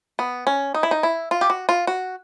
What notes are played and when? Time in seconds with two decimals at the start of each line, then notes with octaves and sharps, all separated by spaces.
0.19 B3
0.47 C#4
0.74 D#4
0.83 E4
0.91 D#4
1.03 E4
1.31 F4
1.41 G4
1.50 F#4
1.69 F4
1.87 F#4